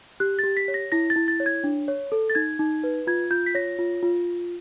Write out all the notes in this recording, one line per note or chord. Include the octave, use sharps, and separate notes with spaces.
G4 F#6
A6
G4
B6
C#5
A#6
E4 A#6
A6
E4
A6
C#5
G#6
D4
C#5
A4
A6
D#4 G#6
D#4
B4
F4 G#6
F4 G6
B6
C#5 A#6
F4
F4